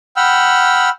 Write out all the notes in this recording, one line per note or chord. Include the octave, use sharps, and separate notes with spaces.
F#5 G5 B5 E6 F6